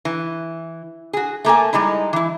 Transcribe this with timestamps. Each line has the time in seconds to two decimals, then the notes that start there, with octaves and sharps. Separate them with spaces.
0.05 E3
1.13 F#4 G#4
1.45 A3 A#3 A4 G#5
1.73 G3 G#3 D#4 E4
2.13 E3 E4